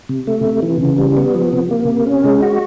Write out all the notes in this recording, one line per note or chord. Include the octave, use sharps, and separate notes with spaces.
C3
A3
C3
E3
C#3
G3
B3
F3
C3
A#3
C3
C#4
G#3
F#4